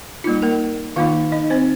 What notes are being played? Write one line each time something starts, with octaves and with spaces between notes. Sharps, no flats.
G3 A#3 D#4 F4
A#3 A#4
D#3 A#3 D#4 F4 F5
D#4 D#5
C4 C5